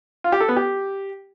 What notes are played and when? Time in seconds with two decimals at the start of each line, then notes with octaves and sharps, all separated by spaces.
0.24 F4
0.32 G4
0.40 A4
0.48 B3
0.56 G4